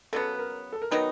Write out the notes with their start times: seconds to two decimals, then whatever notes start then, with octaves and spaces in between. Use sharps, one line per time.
0.13 C#3 F#3 B3 A4
0.34 B4
0.39 A#4
0.72 A4
0.82 A#4
0.91 D#3 F#3 B3 D#4 B4